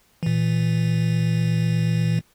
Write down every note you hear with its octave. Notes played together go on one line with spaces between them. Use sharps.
A#2 E3